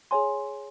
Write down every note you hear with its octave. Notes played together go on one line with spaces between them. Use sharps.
G#4 C#5 G#5 C6